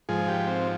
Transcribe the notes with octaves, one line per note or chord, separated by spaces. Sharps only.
G#2 F3 G#4
G4
C4